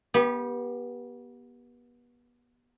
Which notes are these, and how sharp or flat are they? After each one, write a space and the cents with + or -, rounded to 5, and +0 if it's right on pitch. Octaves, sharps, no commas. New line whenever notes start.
B3 -30 G4 +0 B5 +0